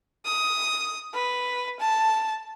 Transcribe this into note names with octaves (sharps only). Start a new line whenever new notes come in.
D#6
B4
A5